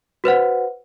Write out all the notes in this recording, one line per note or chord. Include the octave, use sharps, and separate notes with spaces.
F#4 B4 C5 F#5